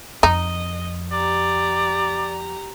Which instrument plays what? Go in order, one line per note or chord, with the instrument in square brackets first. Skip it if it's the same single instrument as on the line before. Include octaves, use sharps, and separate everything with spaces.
[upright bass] F2 [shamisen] D#4 [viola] D#5
[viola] G4 A#5 [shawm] D5